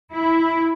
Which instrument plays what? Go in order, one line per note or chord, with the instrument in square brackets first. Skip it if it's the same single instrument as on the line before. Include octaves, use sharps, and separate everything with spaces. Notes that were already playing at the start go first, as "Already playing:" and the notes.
[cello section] E4